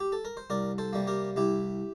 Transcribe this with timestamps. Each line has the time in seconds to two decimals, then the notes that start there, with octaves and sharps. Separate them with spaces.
0.00 G4
0.12 A4
0.25 A#4
0.37 C5
0.50 C2 A#4 D5
0.78 A4 C5
0.93 C3 G3 A#3
1.07 G4 A#4
1.36 C2 E4 G4